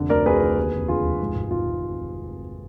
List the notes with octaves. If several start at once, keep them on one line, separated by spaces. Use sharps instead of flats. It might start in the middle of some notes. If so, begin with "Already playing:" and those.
Already playing: F1 D3
D2 A#4 D5
D2 G#4 B4
D3
D#2
F1
D3 F4 G#4
F1
G#2
G#1
D#3 F4
G#1